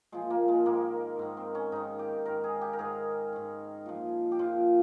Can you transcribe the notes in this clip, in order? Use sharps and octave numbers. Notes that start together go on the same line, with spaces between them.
A#2 F3 G#3
A#3
G#3
G#2 D#3 A#3
G#2 D#3
C4
C#4
G#2 D#3 D#4
G4
G#2 D#3 A#4
G#4
G4
A#4
G#2 D#3 G#4
G#2 D#3
A#2 F3
G4
A#2 F3 F4